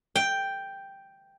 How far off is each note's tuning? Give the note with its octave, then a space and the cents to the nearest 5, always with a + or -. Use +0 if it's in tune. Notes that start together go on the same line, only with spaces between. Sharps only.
G5 +0